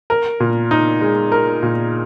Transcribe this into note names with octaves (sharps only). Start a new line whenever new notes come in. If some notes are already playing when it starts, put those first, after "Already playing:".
A#4
A#2
D#4
G#3
A#4
A#2